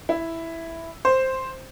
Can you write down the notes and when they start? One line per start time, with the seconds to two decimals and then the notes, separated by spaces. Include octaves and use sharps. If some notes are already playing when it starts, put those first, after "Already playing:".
0.09 E4
1.05 C5